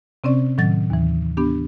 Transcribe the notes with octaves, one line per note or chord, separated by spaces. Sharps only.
C3 C4 C#4 D5
A2 D#3 F#3 A6
D#2 E3
B3 D4 G4